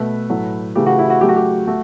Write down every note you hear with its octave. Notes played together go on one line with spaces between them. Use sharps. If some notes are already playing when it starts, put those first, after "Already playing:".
Already playing: B2 A3 B4
A2 F#3 A3
C#3 E3 A3 G4
F#4
E4
F#4
C#3 F#3 A3 G4
F#4
G4
A3 F#4